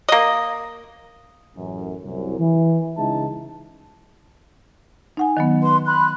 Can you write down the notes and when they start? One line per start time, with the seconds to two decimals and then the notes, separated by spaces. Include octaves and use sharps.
0.09 A#3 D#5
1.56 A1 F#2
2.04 C2 F#2
2.39 E3
2.97 C#2 C#3 G#3 D#4 E4 A5
5.17 D#4 F#5 G#5
5.37 D#3 F#3 B3
5.62 B4 C6
5.86 B5 C6 F#6